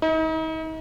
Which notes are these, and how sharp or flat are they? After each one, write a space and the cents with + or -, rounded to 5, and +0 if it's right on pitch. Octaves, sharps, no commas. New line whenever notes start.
D#4 +40